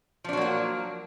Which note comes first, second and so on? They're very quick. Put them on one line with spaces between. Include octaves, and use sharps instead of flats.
F3 D4 F#3 A#3 F#4